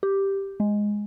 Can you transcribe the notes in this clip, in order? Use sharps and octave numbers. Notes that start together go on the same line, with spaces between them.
G4
G#3